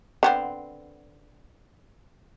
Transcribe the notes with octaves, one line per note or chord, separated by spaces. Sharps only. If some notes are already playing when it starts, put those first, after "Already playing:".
D3 B3 C4